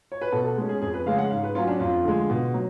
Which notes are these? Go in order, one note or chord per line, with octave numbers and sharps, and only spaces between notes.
C#5
B4
B2 A4
A4
G#3 C#4
G#4
F2 G#4
B4
C#3 G#3 C#4 F5
F#5
G#2 F5
B4
F#3 C#4 F4
D4
F2 F4
D3 G#3
B2
F#3